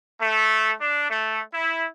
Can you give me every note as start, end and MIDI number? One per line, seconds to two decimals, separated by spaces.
0.21 0.72 57
0.80 1.08 62
1.10 1.41 57
1.54 1.86 64